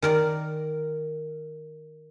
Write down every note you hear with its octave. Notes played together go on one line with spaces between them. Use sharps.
D#3 A#4 D5